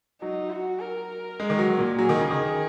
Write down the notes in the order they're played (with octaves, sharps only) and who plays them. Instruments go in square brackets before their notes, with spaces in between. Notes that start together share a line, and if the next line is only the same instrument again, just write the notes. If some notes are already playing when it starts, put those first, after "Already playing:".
[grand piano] F#3 [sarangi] D#4
[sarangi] F#4
A#4
[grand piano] G#3
D#3
F#3
A#2
[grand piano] F#3 [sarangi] G#4
[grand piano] D#3
C#3
D#3